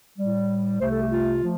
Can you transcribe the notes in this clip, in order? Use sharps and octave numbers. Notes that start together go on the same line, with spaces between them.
A2 G3
C2 C3 A3 C5
A4
G4
F4
F3 A3